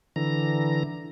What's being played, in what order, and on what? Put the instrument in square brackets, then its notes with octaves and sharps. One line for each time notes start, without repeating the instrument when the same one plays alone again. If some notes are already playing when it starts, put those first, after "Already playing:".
[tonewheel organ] D3 E3 A#5